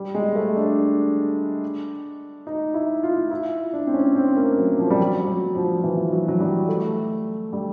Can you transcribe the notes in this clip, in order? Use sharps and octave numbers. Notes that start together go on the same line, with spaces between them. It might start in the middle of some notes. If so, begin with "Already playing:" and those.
Already playing: G3
G#3
A3
D4
D#4
E4
F4
E4
D4
C4
C#4
C4
A#3
F#3
F3
G3
F#3
F#3
F3
E3
F#3
F#3
G3
A3
G3